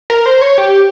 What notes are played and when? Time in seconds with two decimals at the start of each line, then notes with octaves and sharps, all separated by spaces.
0.10 A#4
0.26 C5
0.41 C#5
0.58 G4